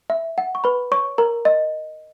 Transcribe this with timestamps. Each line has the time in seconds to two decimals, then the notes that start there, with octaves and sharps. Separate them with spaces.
0.10 E5
0.38 F#5
0.55 C#6
0.64 B4 B5
0.92 C#5 C#6
1.18 A#4 A#5
1.45 D#5